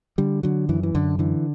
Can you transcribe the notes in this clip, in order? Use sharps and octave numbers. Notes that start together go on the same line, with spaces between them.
D3 G3
D3 F#3
F#2 E3
E3
F#2 D3
D3 E3